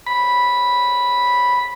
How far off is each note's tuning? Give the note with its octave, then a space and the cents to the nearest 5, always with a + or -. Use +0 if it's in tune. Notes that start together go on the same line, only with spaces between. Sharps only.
B5 -5